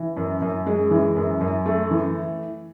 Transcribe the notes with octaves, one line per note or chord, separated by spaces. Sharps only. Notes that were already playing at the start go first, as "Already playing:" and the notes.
Already playing: E3
F#2
F#2
G#3
E3
F#2
F#2
A3
E3